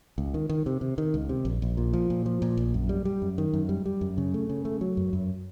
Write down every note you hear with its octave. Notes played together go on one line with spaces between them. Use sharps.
C#2
D#3
D#3
C3
C3
D#3
C#2
C3
A#1
A#1
A#2
F3
A#2
F3
A#2
A#1
F#2
G3
G3
F#2
D#3
F#2
G3
G3
F#2
C#3
A3
C#3
A3
F#3
F#2
F#2